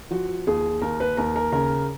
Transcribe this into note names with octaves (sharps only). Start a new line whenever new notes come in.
F3 F#4
D#2 G#4
D#2 A#4
B4
D#2 A#4
A#4
C#3 A#4